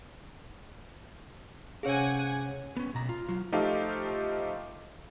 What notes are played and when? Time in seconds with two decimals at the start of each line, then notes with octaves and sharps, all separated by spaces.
1.83 C3 C#4 G#4 C#5 F5 F#5 G#5
2.77 B3 C#4
2.95 B2 A#5
3.09 F4
3.28 F#3 F4
3.52 F3 A3 D#4 G4 A4 F5